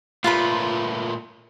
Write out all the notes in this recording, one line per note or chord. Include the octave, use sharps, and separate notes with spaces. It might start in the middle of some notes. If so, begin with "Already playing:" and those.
A#2 A3 F4 B4 B5